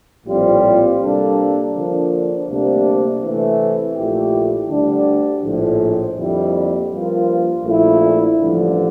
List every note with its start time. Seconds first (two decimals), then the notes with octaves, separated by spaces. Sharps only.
0.26 A#1 A2 G3 C4 F4
1.00 C3 G3 A#3 D4 A4
1.73 D3 F3 A#3 D4
2.47 D2 C3 G3 A#3 D4
3.22 C3 E3 A3
3.95 A#1 A#2 A3 E4 G4
4.69 D2 D3 G3 D4
5.43 A#1 A2 F3
6.17 F2 D3 G3 A#3 E4
6.91 G2 F3 A#3 F4
7.64 A#1 A#2 A3 E4
8.38 A1 G2 D3 F3